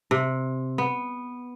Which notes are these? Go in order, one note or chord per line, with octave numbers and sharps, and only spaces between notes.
C3
B3